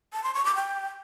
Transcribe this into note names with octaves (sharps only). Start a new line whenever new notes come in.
A5
C6
C#6
D6
G5